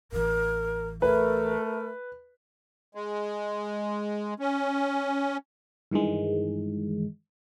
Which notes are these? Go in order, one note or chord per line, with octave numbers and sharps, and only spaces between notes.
A1 E3 A#4
A3 A#4 B4
G#3
C#4
G2 D#3 E3 G#3